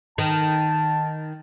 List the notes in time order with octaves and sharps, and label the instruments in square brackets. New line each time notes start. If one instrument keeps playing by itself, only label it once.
[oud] D#3 [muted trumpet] A5